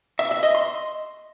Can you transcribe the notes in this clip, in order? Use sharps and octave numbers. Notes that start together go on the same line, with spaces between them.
E5
E5
D#5
C6